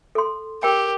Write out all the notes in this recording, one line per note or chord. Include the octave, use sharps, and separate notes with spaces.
A4 C6
G4 A#4 G5